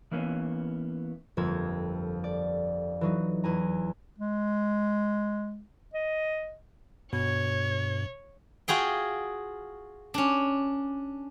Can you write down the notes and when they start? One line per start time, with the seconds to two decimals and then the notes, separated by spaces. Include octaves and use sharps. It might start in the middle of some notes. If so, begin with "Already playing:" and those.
0.11 E3 A#3 B3 C#4
1.37 G1 F2 F3 A#3 E6 G#6
2.24 D5
3.01 E3 F#3 D#4
3.44 E2 E4 G#5 A#5
4.18 G#3
5.94 D#5
7.13 G2 B2 C#5 G#6
8.68 F4 F#4 G#4 G5
10.14 C#4 D4